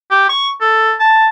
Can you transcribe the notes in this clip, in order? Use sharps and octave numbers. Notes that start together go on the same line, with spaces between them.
G4
C#6
A4
A5